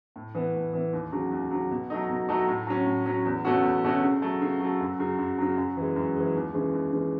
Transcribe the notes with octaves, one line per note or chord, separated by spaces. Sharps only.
A2
E3 B3
A2
E3 B3
D#2
C#3 F#3
D#2
C#3 F#3
B2
F#3 A3 D#4
B2
F#3 A3 D#4
A2
F#3 C#4
A2
F#3 C#4
E2
B2 A3 C#4 F#4
E2
B2 A3 C#4 F#4
C#3
F#3 A3
C#3
F#3 A3
F#2
C#3 F#3
F#2
C#3 F#3
F#2
E3 G#3
F#2
E3 G#3
D#2
C#3 E3 G#3
D#2
C#3 E3 G#3